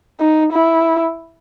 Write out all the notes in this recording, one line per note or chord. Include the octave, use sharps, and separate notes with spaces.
D#4
E4